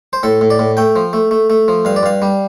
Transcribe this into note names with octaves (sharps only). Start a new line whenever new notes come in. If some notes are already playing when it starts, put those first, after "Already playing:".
C5
A2 A4
A2
D5
A2
A3 G5
F3
A3
A3
A3
F3
G2 F5
D5
G2 F5
G3